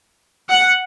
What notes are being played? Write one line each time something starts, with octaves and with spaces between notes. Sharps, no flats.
F#5